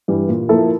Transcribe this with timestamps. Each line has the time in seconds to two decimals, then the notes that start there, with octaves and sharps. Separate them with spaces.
0.08 G2 E3 G3
0.29 A#2
0.49 F3 A#3 E4 A4